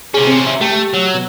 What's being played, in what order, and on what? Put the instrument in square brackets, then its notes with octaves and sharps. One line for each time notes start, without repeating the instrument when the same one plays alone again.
[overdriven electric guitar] C3 C#4 [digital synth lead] G#4
[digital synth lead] C4
E5
[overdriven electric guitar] A3 [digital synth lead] G4
[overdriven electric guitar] F#3 [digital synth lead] E6
[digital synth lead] B2